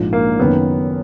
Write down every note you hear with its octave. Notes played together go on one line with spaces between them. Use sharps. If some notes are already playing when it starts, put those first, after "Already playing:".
Already playing: A#1 G#2 F3
A#3
F#1 F#2 D#3 B3